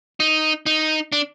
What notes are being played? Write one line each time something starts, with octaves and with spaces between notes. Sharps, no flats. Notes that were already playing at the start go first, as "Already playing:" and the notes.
D#4
D#4
D4